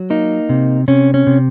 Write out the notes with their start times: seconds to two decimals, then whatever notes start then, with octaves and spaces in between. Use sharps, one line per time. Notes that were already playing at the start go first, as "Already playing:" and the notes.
Already playing: F#3
0.10 A#3 D#4
0.49 C3
0.88 C3 C#4
1.14 C#4
1.27 C3